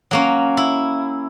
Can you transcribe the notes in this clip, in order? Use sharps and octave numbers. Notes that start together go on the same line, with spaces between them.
F#3 A#3 C#4
E4